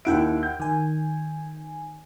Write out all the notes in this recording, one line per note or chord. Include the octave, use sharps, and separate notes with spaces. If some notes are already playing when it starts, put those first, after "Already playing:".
D#2 E4 E5 F#5 G5 D7
G6
D#3 G#5